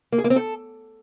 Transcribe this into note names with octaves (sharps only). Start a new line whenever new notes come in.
A#3
G#4
A#3
C4
A4